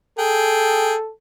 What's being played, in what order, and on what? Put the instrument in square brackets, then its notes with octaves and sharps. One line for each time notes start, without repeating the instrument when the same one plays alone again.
[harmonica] G#4 G5 [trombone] A4